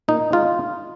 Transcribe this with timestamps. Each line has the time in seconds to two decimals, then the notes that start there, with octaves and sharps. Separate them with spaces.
0.08 A#2 D#4
0.32 G#3 D#4 F4